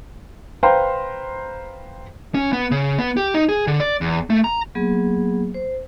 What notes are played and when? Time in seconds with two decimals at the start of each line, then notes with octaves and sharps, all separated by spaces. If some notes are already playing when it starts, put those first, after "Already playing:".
0.63 B4 C5 F5 G5 A#5 C6
2.35 C#4
2.53 B3
2.71 C#3
2.98 B3
3.17 G4
3.34 D#4
3.49 G#4
3.67 D3
3.80 D5
4.01 E2
4.30 A3
4.44 A#5
4.75 F#3 A#3 B3 G#4
5.54 C5